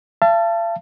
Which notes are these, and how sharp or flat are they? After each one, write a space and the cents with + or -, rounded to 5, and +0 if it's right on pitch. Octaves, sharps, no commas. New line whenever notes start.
F5 -45 A5 +5